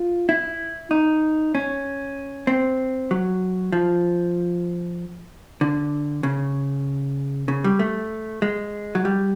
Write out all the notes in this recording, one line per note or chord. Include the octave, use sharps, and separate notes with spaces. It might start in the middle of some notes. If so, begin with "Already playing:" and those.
Already playing: F4
E4
D#4
C#4
C4
F#3
F3
D3
C#3
C#3
G3
A3
G#3
F#3
G3